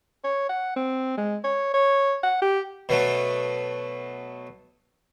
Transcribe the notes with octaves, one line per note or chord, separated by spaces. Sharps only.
C#5
F#5
C4
G#3
C#5
C#5
F#5
G4
B2 F#3 A3